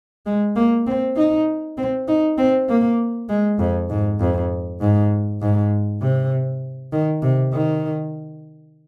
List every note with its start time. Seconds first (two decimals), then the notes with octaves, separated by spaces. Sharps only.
0.26 G#3
0.56 A#3
0.87 C4
1.17 D#4
1.77 C4
2.08 D#4
2.38 C4
2.69 A#3
3.29 G#3
3.59 F2
3.90 G#2
4.20 F2
4.81 G#2
5.41 G#2
6.01 C3
6.93 D#3
7.22 C3
7.53 D#3